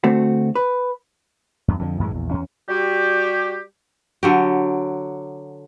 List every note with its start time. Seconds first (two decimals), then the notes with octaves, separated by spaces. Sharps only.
0.04 D2 A3 C4 F#4
0.55 B4
1.68 E2 G2
1.79 F2 D3 F3
2.00 F#2 A2 E3 G#3
2.14 A#1 E2
2.31 E2 C#4
2.69 G3 F#4 G4
4.23 D3 F#3 G4